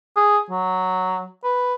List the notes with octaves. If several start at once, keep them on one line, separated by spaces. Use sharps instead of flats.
G#4
F#3
B4